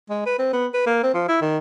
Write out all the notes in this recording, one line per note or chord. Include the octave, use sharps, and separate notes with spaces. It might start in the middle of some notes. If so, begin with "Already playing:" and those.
G#3
B4
C4
B3
B4
A#3
C4
F3
E4
D#3